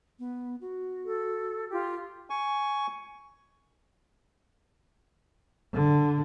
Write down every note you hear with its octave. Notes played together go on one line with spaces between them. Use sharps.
B3
F#4
A4
F4 G4
G#5 C#6
D3